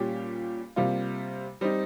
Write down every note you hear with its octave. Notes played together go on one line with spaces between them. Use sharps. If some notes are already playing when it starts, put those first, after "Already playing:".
Already playing: A#2 G3 C#4 G4
C3 G3 A#3 F4
G3 C4 D#4